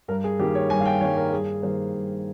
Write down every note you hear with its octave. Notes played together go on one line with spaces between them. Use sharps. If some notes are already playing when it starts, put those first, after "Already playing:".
G2 A#4
G#4
D#3 G3 A#3 G4
C#5
G2 G#5
F5
G5
D#3 G3 A#3 C#5
A#4
G2 G#4
D#3 G3 A#3 C5
G2